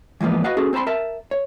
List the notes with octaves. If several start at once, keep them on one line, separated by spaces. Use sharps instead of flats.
E3 F3 G#3 A#3 B3
F#4 B4 D#5 F5 F#5
C#4 F#4 G#4 A4
C4 C5 A5 B5 C6
A#4 E5 A5
C#5